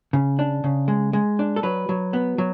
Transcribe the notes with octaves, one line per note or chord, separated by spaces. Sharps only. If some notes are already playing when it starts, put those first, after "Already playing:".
C#3
D4
C#3
G#3
G#3
D4
A4
F#3 B4
F#3
B3
F#3